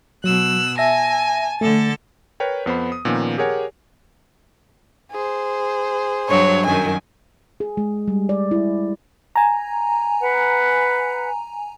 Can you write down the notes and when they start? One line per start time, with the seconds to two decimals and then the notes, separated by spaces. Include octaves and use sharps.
0.24 B2 F#3 E6 F#6
0.78 E5 G#5 A5 A#6
1.61 D3 A3 A4 A6
2.40 A#4 B4 C#5 G5
2.66 F2 B3 C5 B5
2.92 D#6
3.05 A#2 D#3 F3 A#3 B3 C#4
3.38 G4 G#4 A#4 C#5 F#5 G#5
5.12 G#4 C5
6.29 G2 F#3 D4 C#5
6.66 F#2 D#3 G#5
7.60 G#4
7.77 G#3
8.08 G3
8.29 D5
8.51 E4
9.36 G#5 A#5
10.20 B4 F#5